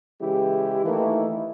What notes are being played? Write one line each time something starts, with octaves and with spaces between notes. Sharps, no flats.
C#3 E3 G#3 E4 G4
D#3 E3 A3 A#3 D#4 E4